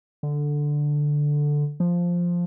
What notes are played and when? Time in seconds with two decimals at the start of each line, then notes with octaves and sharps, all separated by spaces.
0.23 D3
1.80 F3